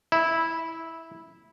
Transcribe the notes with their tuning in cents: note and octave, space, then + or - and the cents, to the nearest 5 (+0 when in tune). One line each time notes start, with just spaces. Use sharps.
E4 -10